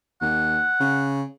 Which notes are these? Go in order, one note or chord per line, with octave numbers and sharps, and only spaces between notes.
D#2 F#5
C#3